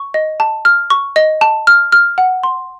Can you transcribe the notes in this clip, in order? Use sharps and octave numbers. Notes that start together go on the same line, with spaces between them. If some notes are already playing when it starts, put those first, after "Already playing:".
Already playing: C#6
D#5
A5
F6
C#6
D#5
A5
F6
F6
F#5
C6